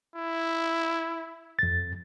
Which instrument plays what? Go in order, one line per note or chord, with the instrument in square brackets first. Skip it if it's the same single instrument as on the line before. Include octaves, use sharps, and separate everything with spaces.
[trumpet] E4
[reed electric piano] F2 A6